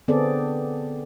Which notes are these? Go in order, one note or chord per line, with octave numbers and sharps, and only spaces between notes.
D3 B3 C4 G#4 A4 D5